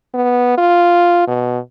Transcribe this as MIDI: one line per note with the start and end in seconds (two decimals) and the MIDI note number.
0.14 0.56 59
0.58 1.25 65
1.27 1.59 47